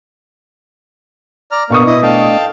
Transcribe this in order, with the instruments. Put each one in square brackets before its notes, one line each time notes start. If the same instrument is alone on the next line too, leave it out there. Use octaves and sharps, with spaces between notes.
[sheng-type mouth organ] D5 A#5 F6
[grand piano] B2 C#6 D#6 [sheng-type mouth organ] A#3 [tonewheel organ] D4
[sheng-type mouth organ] E4 D#5
[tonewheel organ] A3 D4 D#5 [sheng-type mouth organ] F5 G5 A5